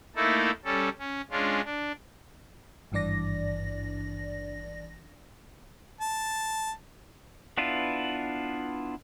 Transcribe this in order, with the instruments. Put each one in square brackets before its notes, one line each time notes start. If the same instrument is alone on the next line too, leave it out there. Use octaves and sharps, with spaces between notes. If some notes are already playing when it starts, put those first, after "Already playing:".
[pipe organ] A3 A#3 D#4 E4 A4
G3 C#4 A4
C#4
G#3 C#4 D4 F4
D4
[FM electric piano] G#1 G2 E3 D4 D5 A#6
[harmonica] A5
[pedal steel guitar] B3 D4 E4 F4 B4